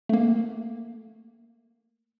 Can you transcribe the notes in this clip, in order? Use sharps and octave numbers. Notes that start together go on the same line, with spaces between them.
A3 A#3